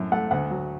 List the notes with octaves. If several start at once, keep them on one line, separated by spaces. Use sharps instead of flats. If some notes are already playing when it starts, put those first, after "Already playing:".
Already playing: F#2 A2
A3 F#5
D2 F#5
F#3